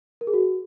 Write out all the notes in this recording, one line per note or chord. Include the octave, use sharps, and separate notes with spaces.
A#4
G#4
F#4